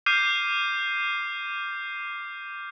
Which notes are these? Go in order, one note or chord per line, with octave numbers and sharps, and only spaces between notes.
D6 F6 G6 C7 D#7